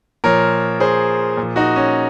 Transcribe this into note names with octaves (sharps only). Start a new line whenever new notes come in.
A#2 F3 A#4 C#5
G#4 C5
A#2 F3
D#4 F#4
C#4